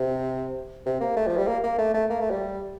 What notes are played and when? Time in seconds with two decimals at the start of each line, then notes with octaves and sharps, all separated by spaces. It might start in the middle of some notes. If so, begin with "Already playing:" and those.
Already playing: C3
0.86 C3
1.01 A#3
1.17 A3
1.27 F3
1.37 G3
1.48 A#3
1.64 A#3
1.78 A3
1.94 A3
2.10 A#3
2.20 A3
2.31 G3